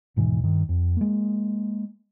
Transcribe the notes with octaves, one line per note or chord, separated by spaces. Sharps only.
D#1 G#2 B2 E3
G2 D#3
F2
G#3 A#3